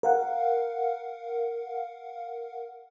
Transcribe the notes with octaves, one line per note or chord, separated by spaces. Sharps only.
A#4 F5 F#5